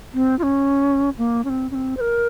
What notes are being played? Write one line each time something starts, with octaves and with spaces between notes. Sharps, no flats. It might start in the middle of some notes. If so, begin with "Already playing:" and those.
C4
F4
C#4
A#3
C#4
C4
C#4
C4
C5
A#4